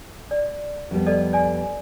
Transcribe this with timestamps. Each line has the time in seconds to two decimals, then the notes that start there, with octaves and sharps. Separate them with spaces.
0.31 D5
0.91 F2 G3 B3
1.06 A4 D5 D#5
1.33 D5 G#5